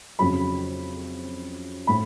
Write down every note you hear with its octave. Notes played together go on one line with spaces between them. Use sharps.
F2 C#3 F#3 B5
A2 B5